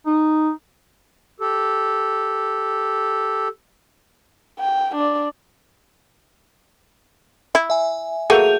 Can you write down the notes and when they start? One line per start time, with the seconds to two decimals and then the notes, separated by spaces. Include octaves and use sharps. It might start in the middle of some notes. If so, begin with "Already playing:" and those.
0.06 D#4
1.40 G4 A4
4.60 G5
4.96 D4 D5
7.55 E4
7.70 E5 G#5
8.30 F#3 A3 A#3 G#4 G6 F7